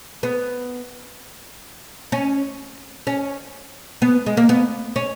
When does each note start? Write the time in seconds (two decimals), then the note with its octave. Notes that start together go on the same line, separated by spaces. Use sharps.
0.23 B3
2.12 C#4
3.07 C#4
4.02 B3
4.26 G#3
4.37 A#3
4.49 B3
4.96 C#4